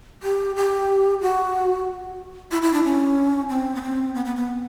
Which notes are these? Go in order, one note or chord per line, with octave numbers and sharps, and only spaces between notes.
G4
G4
F#4
E4
E4
D4
C#4
C4
B3
C4
B3
B3
B3